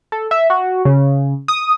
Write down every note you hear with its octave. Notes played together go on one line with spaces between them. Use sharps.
A4
E5
F#4
C#3
D#6